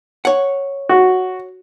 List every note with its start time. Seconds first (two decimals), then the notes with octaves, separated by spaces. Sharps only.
0.25 C#5 F#5
0.89 F#4